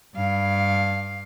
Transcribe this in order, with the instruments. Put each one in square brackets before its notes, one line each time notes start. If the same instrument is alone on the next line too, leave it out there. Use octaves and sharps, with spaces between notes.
[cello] G2 F5